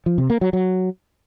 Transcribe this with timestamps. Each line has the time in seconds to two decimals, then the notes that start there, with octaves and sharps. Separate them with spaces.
0.06 F3
0.18 C3
0.30 A#3
0.41 F#3
0.53 F#3